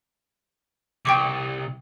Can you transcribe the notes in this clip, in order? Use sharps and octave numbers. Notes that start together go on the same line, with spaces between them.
C2 G5 C#6 D6